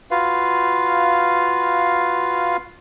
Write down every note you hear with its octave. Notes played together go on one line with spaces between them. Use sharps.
F4 F#4 B4 F5